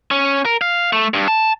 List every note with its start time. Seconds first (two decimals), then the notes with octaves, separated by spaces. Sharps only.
0.11 C#4
0.45 A#4
0.61 F5
0.93 A3
1.14 G2
1.28 A5